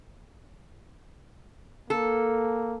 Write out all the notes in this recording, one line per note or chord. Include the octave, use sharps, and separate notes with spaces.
A#3 A4